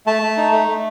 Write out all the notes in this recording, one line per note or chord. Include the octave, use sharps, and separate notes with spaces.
A3 A5
A3
D#4
A3
A3